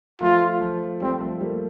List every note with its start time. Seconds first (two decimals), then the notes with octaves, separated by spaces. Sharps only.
0.21 F3 A3 F4
0.61 F3
1.02 G3 C4
1.21 F3 A3
1.41 G3 A#3